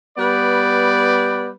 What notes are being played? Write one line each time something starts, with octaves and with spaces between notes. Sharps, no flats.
G3 B3 B4 D5